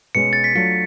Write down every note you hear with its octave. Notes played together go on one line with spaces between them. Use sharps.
B2 G#3 C#4 G#4 C#7
A6
B6
F#3 A3 D4 F4 C#7